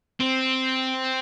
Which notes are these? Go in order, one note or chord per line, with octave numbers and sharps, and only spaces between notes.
C4